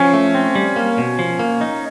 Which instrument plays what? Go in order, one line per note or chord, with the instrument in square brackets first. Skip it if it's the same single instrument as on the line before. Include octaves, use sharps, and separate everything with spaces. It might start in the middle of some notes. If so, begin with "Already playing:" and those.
Already playing: [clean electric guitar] F3 [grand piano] C#4
[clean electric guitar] A3
C4
G3
A#3
B2
F3
A#3
D#4